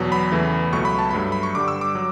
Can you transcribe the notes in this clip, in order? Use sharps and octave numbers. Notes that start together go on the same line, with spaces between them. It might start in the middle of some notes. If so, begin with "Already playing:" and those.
Already playing: E2 B2 F#3
B5
E2 C#3 E3 A3
C#2 B2 F#3 A3 C#6
B5
A5
G2 F#3 A3 B5
B5
C#6
G2 D3 G3 D6
E6
D6
F#3